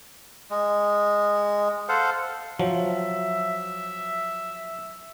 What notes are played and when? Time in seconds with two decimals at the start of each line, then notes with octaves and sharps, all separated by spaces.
0.50 G#3
1.89 A4 C5 F5 F#5
2.59 F3 F#3 E5